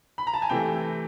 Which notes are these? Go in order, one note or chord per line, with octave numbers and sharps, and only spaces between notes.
B5
A#5
A5
G#5
C3 E3 A3 G5